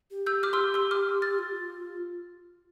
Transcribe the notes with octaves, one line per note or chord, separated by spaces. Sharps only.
G4
E6 G6
D6 F6
C6 E6
C6 E6
D6 F6
F6 A6
F4